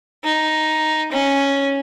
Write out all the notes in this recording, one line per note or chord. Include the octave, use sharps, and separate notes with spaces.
D#4
C#4